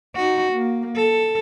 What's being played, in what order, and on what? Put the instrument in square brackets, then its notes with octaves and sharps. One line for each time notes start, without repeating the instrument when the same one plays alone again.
[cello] D#4 F#4
A#3
A4